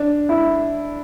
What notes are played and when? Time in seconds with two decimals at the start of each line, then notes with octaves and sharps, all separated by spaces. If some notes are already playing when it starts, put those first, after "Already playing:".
Already playing: D4
0.29 E4